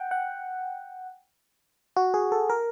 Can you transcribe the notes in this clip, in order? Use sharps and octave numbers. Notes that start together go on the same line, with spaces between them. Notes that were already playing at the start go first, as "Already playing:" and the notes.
Already playing: F#5 G5
F#5
F#4
G#4
A4
A#4